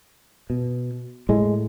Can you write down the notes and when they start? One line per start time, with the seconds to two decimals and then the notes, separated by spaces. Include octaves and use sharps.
0.50 B2
1.29 A2 G#3